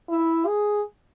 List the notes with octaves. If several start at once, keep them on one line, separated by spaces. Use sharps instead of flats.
E4
G#4